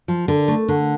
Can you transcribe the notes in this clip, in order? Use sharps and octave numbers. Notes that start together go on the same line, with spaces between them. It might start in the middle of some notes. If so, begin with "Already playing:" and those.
F3
D3
A3
D3